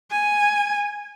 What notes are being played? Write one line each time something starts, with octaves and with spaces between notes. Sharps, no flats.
G#5